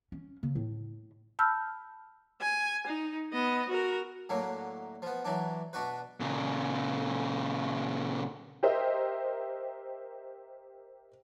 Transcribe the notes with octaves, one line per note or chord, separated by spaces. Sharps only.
C#4
C#3
A2
A5 B5 E6 F6 G6
G#5
D#4
B3 D#5
F#4 A#4
A2 D3 F#3 A#3
F3 B3
E3 F#3 D4
B2 D4 F#4 B4
A#2 C#3
G4 A#4 C5 D#5 E5